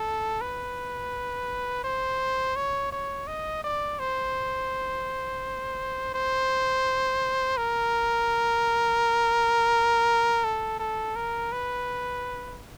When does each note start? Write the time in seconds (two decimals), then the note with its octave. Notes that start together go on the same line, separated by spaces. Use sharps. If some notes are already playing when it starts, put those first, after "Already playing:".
Already playing: A4
0.41 B4
1.84 C5
2.56 C#5
2.92 C#5
3.27 D#5
3.64 D5
3.99 C5
6.14 C5
7.57 A#4
10.44 A4
10.79 A4
11.16 A#4
11.52 B4